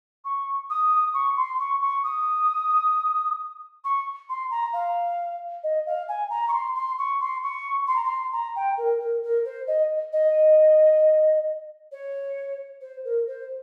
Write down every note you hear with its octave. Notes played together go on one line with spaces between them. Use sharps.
C#6
D#6
C#6
C6
C#6
C#6
D#6
C#6
C6
A#5
F5
D#5
F5
G#5
A#5
C#6
C6
C6
C#6
C6
C#6
C6
A#5
C6
A#5
G5
A#4
A#4
A#4
C5
D#5
D#5
C#5
C5
A#4
C5